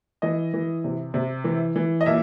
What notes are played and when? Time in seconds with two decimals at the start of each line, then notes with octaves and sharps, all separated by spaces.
0.22 E3 D#5
0.54 E3
0.84 C3
1.14 C3
1.44 E3
1.76 E3
2.01 D#5
2.06 A#2 E5